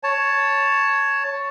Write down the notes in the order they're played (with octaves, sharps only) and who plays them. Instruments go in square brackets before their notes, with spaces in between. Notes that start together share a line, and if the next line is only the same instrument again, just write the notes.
[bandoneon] C#5 A5